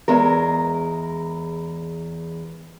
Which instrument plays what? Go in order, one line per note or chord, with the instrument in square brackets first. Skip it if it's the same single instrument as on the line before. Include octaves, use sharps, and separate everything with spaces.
[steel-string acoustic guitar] E2 G#3 A#4